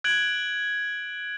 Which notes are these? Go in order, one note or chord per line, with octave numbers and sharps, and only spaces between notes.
F#6 G#6 D7 F#7